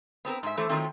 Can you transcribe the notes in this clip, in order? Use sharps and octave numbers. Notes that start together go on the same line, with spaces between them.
B3 C4 A4 A#4
G#2 E5
E3 A3 A4 C5
D#3 F3 F#3 A3 C4